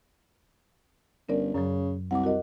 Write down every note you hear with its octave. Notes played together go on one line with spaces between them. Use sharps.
G1 C#4 A#4 D5
F#2 C#3 F#3
C2 F#5 D6
F#4 A#4 D#5